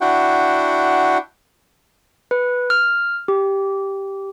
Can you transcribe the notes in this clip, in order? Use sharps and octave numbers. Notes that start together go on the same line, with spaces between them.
D4 E4 F#4 F#5 G5
B4
F6
G4